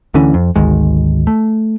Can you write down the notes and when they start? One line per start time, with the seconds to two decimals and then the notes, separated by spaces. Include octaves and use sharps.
0.14 D2 D3 E3 C#4
0.34 F2
0.56 G#1 D2 D#3 G#3
1.27 A3